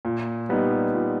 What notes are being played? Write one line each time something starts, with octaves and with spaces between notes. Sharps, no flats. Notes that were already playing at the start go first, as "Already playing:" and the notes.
A#2
G3 B3 D#4
A#2